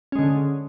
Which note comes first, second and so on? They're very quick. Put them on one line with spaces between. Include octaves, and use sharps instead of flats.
C#4 G#3 D3